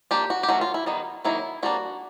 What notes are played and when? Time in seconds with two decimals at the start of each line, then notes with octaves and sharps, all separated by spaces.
0.11 F3 A#3 D4 G4
0.30 F#4
0.43 G4
0.49 D#3 F#3 A3 C#4 F#4
0.61 F4
0.74 E4
0.86 D#3 G3 B3 D#4
1.25 D#3 F#3 A#3 D#4 E4
1.63 G3 A#3 D4 F#4